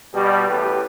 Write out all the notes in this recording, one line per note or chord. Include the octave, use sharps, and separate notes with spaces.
B2 G3
A1 E2 A2 G4 B4